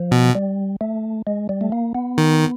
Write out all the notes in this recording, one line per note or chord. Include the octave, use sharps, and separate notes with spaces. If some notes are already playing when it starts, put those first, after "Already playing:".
Already playing: F3
B2
G3
A3
G#3
G3
A3
A#3
B3
D#3